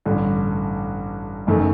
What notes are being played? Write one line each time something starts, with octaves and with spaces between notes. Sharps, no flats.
A1 G2 D3
F#1 F#2 D#3 A3 D#4